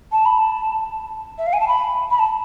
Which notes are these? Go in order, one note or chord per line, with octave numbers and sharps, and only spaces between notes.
A5
B5
A5
E5
F5
G#5
A5
B5
B5
A5